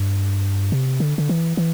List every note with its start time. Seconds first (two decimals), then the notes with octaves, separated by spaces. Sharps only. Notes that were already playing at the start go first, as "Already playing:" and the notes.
Already playing: G2
0.72 C3
1.00 D3
1.18 D3
1.29 E3
1.57 E3